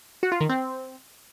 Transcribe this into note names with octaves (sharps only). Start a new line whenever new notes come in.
F#4
F4
D#3
C4